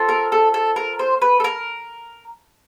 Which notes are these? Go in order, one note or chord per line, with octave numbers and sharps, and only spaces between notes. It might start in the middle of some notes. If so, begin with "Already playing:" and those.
Already playing: C4 F4 A4
A#4
A4
A4
A#4
C5
B4
A4
A#4